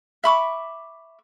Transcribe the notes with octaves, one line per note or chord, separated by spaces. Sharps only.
E5 B5 C#6 D6